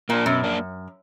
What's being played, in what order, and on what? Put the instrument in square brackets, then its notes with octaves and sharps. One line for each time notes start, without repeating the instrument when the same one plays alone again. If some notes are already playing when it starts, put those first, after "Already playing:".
[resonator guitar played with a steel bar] A#2 [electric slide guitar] A#3 D4
[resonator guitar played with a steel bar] F#2 [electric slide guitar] B2
[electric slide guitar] A#3 D4